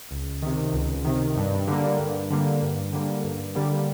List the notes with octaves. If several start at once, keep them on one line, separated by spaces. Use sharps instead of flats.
C#2
C3 D#3
C#2
C3 D#3
G2
D3 G3 A#3
G2
D3 G3 A#3
G2
D3 G3 A#3
G2
D3 G3 A#3